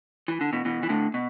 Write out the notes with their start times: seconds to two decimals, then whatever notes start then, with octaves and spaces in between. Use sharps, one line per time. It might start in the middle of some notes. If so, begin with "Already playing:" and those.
0.28 E3
0.41 D3
0.53 B2 E3
0.65 B2 E3
0.83 E3
0.89 A2 D3
1.14 B2